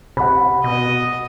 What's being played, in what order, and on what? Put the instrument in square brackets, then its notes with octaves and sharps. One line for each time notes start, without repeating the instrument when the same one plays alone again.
[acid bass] C3 [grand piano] F#5 B5
[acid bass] B2 [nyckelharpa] D#5